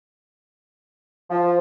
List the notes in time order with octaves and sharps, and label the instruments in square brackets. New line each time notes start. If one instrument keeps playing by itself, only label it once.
[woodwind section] F3